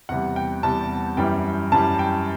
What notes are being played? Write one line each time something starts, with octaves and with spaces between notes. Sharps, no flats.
E2 C3 G3 F#5
G5
E2 C3 G3 A5
F#2 E3 G3 G5
F#2 E3 G3 A5
G5